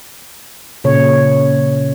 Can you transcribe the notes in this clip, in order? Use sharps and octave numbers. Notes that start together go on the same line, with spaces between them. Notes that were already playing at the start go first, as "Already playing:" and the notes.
A#2 C#3 C#5